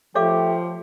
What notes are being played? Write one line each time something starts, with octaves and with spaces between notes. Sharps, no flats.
F3 A3 G4 C#5 F5 D6